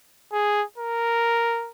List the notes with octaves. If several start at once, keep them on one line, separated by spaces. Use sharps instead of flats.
G#4
A#4